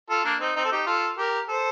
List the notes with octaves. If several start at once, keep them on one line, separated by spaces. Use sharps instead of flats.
F4 A4
A#3 D4
C4 D#4
C4 D#4
A4
D#4 G4
F4 A4
G4 A#4
A4 C5